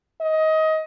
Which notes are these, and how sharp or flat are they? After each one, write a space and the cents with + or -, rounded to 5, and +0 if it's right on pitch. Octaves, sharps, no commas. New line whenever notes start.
D#5 +20